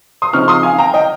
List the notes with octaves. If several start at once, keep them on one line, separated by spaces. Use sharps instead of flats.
C6 D#6
C#3 F3 C4 D#4 C#6 F6
C6 D#6
F5 G#5
G5 A#5
D#5 G5